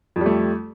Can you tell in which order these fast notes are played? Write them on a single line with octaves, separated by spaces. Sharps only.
F2 G3 A3